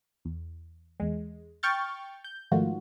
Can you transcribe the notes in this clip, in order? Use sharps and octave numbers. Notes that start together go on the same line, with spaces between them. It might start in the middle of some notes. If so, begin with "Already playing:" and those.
E2
E2 G#3
G5 C#6 F6 G6 A6
G6
G#2 D#3 F3 A3 F4 F#4